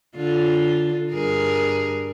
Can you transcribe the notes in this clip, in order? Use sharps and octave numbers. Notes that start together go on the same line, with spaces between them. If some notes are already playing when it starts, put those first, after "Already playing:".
D3 F4
G2 G#4 A#4